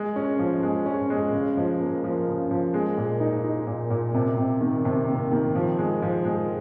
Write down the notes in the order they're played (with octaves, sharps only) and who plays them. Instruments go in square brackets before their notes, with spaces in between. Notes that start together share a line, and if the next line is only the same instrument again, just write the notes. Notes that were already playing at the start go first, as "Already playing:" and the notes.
Already playing: [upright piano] G#3
C#4
F3
G#3
C#4
G#3
C#3
F3
A#3
F3
C#3
F3
G#3
A#2
D#4
D#4
A#2
A#2
C3
C3
D#3
C3
A#3
D#3
F3
G#3
F3
G#3